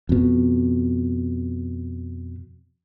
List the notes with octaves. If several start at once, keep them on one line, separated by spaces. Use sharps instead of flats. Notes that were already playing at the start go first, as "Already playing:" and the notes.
F2 B2